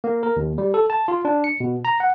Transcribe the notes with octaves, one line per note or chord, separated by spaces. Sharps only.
A#3
A#4
D#2
G3
A4
A5
F4
D4
C#7
B2
A#5
F#5